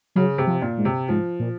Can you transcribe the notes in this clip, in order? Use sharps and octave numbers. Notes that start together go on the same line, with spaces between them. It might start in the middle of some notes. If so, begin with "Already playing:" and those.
C#3 F#3
C3
F3
A#2
G#2
C3
G#2 F3
A#2